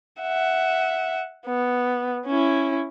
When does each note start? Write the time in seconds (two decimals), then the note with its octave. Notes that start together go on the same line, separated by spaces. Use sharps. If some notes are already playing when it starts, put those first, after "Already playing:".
0.21 E5 F#5
1.46 B3
2.26 C#4 E4